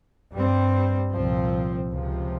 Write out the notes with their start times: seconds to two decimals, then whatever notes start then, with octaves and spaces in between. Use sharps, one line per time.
0.32 G2 G3 C4
1.11 C2 A#2 F3 C4
1.90 C#2 C3 F3